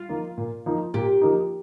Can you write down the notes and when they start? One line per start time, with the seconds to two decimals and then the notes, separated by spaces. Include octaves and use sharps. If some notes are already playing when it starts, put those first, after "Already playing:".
Already playing: F4
0.09 F3 A#3 D#4
0.37 A#2
0.66 F3 A#3 D#4
0.94 A#2 G4
1.22 F3 A#3 D#4